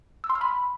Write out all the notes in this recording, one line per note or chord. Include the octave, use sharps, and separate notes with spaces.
E6
C6
F6
B5